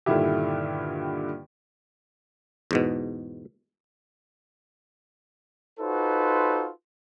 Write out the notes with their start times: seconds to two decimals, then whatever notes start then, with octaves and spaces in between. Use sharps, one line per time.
0.06 G2 A#2 D3 D#3 E4 G4
2.71 E2 G#2 B2
5.80 D#4 F4 F#4 A4 B4 C5